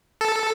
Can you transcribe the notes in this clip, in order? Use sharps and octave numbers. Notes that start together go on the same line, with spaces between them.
A4